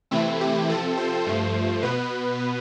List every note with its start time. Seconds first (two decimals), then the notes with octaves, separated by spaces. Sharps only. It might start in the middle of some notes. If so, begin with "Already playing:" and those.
0.11 C3 E3 A3 C4 E4
0.41 G4
0.69 C3 F3 C4 A4
0.97 C5
1.26 G2 F3 A3
1.83 B2 B3 B4